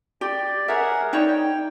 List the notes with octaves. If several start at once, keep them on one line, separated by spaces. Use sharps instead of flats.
G4 D5
G#4 A#4 C#5 E5 F#5
D#4 C#5 D5 G5
G5